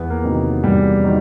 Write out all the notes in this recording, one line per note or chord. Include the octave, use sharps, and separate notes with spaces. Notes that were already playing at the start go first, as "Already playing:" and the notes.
Already playing: E2 B3
A#3
C3 D#3 F#3
E2 G3
D#3 F#3